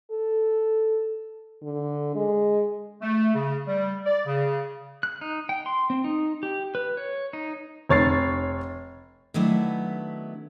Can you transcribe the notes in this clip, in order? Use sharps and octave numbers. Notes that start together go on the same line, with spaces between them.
A4
D3
G#3
A3
C#3
G3
D5
C#3
F#6
D#4
G5
C6
C4
D#4
G4
B4
C#5
D#4
F1 C#5 A6 C7
D#3 F#3 A3 B3 D4 E4